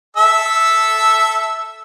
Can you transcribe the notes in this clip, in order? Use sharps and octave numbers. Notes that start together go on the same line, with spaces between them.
A4 E5 E6